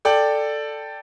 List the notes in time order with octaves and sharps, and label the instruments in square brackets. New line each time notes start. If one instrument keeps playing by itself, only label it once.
[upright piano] A4 D5 G5